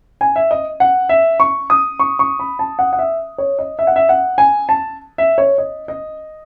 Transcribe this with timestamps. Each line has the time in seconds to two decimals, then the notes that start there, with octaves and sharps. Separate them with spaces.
0.21 G#5
0.36 E5
0.51 D#5
0.80 F#5
1.09 E5
1.40 C#6
1.70 D#6
2.00 C#6
2.19 C#6
2.39 B5
2.59 A5
2.79 F#5
2.93 F#5
2.99 E5
3.38 C#5
3.59 D#5
3.79 E5
3.87 F#5
3.96 E5
4.09 F#5
4.38 G#5
4.69 A5
5.18 E5
5.38 C#5
5.58 D#5
5.88 D#5